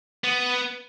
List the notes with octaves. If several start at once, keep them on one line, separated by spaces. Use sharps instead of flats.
B3